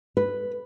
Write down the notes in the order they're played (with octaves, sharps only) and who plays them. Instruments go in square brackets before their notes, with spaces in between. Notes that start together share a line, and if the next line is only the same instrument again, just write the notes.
[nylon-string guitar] B4